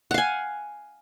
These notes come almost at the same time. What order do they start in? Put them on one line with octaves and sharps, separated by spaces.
F#5 F5 G#5